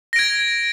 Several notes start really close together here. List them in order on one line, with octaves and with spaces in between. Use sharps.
A#6 D7 G#6